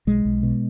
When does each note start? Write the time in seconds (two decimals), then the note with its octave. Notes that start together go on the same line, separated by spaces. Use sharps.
0.07 B1 G#3
0.25 B1
0.43 B2